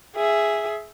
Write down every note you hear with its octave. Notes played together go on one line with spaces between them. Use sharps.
G#4 E5